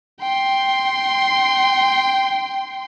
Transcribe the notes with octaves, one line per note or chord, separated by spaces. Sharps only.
G5 C6